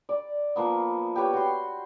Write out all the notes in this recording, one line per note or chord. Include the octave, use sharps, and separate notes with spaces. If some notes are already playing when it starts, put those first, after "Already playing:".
D5
F3 A#3 B3
G4 B4 C#5 G5
F#4 C6